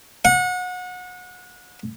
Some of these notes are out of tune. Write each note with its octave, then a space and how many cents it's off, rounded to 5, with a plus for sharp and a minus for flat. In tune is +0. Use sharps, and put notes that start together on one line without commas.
F#5 -30